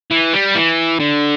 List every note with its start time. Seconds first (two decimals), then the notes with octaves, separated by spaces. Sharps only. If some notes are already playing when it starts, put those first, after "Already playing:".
0.11 E3
0.33 G3
0.55 E3
1.00 D3